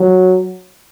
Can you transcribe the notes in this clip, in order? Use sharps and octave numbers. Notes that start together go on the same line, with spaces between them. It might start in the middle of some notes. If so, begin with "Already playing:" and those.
Already playing: F#3